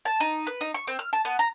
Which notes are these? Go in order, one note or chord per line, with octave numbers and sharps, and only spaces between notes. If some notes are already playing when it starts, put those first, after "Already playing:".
A5
D#4
B4
D#4
C#6
C4
F6
A5
B3
A#5